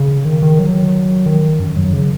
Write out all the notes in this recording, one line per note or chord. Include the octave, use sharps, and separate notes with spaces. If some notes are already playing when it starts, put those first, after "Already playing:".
Already playing: C#3
D#3
D#3
F#3
D#3
F#2
F#3
C#3